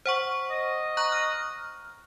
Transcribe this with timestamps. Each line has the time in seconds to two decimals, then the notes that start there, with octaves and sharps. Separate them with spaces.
0.06 C5 F#5 C#6
0.50 D#5
0.97 A#5 C#6 F#6
1.12 F6